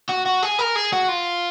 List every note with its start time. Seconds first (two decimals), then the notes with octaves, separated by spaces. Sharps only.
0.09 F#4
0.26 F#4
0.42 G#4
0.59 A#4
0.76 G#4
0.93 F#4
1.09 F4